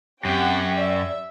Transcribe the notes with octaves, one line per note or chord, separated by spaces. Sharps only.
F#2 C4 G4 F#5 G5
D5 E5